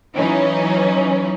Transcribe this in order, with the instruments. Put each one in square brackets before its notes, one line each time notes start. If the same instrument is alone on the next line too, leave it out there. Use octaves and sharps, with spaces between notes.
[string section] E3 F#3 C#4 D#4